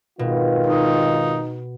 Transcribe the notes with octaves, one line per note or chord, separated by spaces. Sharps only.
G#1 B2 D#3 F4
D#4